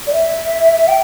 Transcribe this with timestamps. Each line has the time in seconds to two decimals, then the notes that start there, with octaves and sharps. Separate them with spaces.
0.07 D5
0.13 E5
0.88 G5